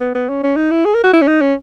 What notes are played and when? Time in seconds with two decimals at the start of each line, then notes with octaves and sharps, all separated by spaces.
0.01 B3
0.15 B3
0.29 C#4
0.43 C#4
0.56 D#4
0.71 E4
0.85 G#4
0.94 A#4
1.04 F#4
1.13 E4
1.22 C#4
1.28 D#4
1.41 C#4